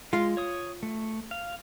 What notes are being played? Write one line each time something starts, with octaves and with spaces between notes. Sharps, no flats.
G#3 F4 F5
C#5 D#6
A3
F5